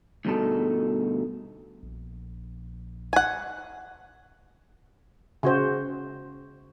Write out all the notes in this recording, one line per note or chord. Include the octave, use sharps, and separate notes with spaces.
D2 G2 B2 D#4 A4
A#1
F#5 G#5
C#3 F#4 C5